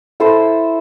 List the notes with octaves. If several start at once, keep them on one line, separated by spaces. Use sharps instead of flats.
E4 A4 C5